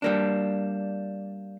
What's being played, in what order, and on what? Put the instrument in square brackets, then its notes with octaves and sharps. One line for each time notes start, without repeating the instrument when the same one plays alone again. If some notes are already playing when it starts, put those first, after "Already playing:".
[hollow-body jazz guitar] G3 A#3 D4